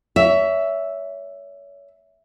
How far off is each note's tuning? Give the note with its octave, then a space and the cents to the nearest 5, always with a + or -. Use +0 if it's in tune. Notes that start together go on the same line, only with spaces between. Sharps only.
C#5 +30 E5 +0